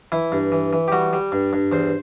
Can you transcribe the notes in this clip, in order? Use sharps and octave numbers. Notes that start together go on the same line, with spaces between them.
E3 E4
G2
E3
E3
G4
G3 F#4
G3
G2
G2
E2 C5